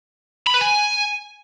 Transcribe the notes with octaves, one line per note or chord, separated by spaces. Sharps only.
B5
B4
G#5